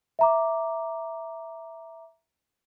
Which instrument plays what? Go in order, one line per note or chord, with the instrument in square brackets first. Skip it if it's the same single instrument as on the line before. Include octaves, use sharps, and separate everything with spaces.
[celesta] E5 A#5 D6